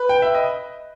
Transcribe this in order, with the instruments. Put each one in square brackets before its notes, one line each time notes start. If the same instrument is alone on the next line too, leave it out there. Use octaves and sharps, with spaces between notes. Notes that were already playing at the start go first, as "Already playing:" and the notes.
Already playing: [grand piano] B4
G5
E5
D#5